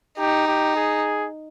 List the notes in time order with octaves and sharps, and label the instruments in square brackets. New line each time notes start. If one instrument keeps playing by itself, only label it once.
[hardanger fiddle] D#4 [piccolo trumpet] G4
[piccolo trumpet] G4
G#4